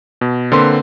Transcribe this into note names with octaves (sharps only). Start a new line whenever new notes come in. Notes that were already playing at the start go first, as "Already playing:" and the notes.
B2
D3 A#3 C4 B4 C6